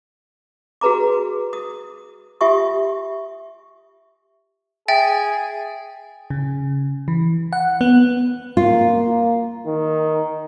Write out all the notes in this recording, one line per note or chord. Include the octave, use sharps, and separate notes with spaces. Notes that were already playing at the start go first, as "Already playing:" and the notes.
F#4 G#4 B4 A#5 D6
D#6
F4 G4 E5 G#5 C#6 D#6
G#4 E5 G5 A6
C#3
E3
F#5
B3
A#3 F4
D#3